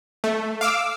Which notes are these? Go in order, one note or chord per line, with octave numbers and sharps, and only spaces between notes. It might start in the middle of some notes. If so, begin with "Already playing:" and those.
A3
F5 D6 E6